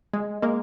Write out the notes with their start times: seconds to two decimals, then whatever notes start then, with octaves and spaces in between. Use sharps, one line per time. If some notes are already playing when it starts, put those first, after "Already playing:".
0.13 G#3
0.42 G#3 A#3